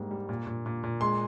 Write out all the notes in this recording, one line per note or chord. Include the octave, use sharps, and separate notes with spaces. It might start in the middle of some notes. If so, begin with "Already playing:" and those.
Already playing: G#2 G3 A#3
G3
A#2
A#2
A#2
A#2
G#3 C6